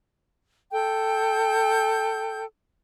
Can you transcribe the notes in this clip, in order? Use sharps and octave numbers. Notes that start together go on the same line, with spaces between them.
A4 G5 G6